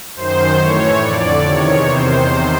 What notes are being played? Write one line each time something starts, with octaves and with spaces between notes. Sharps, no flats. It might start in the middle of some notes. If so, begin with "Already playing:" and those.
F#2 D#3 C5
A2 E3 C#5
F2 D3 D5
E2 C3 D#3 C#5
E2 C3 D#3 C5